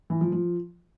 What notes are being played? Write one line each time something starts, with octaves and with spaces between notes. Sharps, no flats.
E3
F3
F3